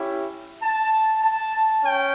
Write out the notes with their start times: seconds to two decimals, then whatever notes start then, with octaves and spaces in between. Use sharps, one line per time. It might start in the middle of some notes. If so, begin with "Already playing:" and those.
Already playing: C#4 E4 G4
0.62 A5
1.23 A5
1.84 C#4 G5